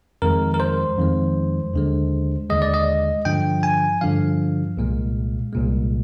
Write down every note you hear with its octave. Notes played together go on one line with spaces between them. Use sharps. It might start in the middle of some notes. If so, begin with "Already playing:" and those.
F2 D#3 G#3 A#4
A#4
C5
F2 D#3 G#3
D#2 D3 G#3
D#2 D3 G#3 D#5
D5
D#5
G2 D3 F3 G5
G#5
G2 D3 F3 F5
C2 A#2 G#3
C2 A#2 G#3